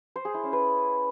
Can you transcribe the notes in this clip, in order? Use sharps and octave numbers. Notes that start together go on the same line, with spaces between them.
C5
G#4
E4
C#4
B4